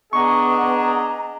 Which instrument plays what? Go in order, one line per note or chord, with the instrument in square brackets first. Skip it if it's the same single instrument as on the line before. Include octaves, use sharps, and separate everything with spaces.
[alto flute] B3 [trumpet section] D4 G#4 D#5 [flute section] A#5 [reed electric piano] C#6